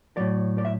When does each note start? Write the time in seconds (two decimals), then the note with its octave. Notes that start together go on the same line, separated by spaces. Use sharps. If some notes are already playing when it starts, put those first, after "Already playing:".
0.17 A2 F#3 D5
0.58 D5
0.65 E5